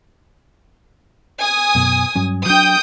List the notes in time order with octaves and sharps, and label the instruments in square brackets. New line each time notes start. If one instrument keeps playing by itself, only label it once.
[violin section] G#5 D#6
[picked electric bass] F#2 B2
G2 F#3 C#4
[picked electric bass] F#3 D4 [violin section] G5 D#6 G6